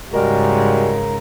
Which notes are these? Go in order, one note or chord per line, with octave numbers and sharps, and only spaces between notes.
G#2 C#3 G3 G#3 F#4 A#4